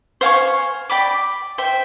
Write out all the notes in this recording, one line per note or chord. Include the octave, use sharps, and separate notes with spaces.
C5 F5 G#5 C#6
D5 G5 B5 D6
C5 E5 G5